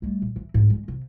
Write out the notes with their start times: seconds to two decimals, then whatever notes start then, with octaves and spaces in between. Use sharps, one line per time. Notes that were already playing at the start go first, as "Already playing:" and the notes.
0.02 G3 A3
0.22 A#2
0.36 E3
0.54 D1 G#2
0.70 D3 G#3
0.88 C3